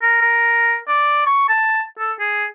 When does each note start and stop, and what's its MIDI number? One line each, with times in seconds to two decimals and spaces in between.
0.02 0.21 70
0.21 0.76 70
0.88 1.21 74
1.26 1.45 85
1.49 1.83 81
1.99 2.13 69
2.20 2.45 68